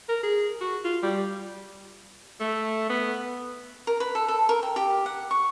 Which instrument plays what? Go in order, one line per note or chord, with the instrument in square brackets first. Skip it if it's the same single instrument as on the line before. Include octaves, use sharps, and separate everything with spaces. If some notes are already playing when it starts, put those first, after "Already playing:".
[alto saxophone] A#4
G#4
F#4
F4
G3
A3
B3
[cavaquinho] A#4
B4
A4
A4
A#4
G5
G4
F#5
C#6